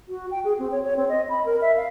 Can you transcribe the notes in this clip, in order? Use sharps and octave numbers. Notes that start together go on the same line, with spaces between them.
F#4
G5
G#4
C4
C#5
C#5
C4
D#5
B5
A#4
E5
F5